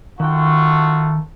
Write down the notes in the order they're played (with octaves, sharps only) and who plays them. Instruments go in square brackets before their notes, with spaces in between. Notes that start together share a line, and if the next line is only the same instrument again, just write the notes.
[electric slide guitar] D#3 G5 [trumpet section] A3 F4 F#4